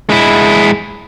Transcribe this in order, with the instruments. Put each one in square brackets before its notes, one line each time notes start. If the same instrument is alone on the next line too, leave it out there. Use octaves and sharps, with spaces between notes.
[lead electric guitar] G#3 E4